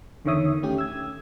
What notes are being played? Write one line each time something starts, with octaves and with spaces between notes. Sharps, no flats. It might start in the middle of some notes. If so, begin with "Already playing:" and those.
E2 D3 D#3 C#5 E5 D#6
A3 C#4 G4
E6 G#6